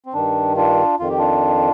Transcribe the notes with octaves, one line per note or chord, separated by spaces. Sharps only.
C4
G2 D#3 D4
D4 F4
F2 D#3 F4
G4
D4 F4